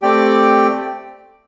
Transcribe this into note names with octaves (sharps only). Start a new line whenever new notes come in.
A3 C4 G4 D5 G5